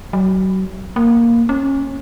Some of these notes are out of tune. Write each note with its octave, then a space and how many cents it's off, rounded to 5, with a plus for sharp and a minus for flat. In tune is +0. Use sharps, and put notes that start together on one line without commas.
F#3 +35
A#3 +0
C#4 -20